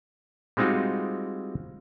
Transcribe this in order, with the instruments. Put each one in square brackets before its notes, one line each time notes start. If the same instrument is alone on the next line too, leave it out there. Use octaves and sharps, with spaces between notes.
[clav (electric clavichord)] G3 G#3 C4 D#4 F4 F#4